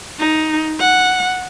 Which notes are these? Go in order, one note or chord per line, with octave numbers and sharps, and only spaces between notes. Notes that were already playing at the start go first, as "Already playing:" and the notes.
D#4
F#5